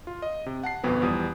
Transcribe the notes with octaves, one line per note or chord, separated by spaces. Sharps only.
F4
D#5
C3
F#5 A5 C7
G1 F2 B2 B3 C4
E2 F3 G3 D#6